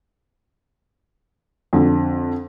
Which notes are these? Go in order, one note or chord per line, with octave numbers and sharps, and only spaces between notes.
F2 D3